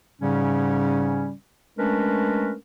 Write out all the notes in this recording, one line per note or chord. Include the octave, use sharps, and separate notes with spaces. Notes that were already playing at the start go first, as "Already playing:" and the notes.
G#2 C#3 G3 C#4
G#3 A3 C#4 D4 A#4 B4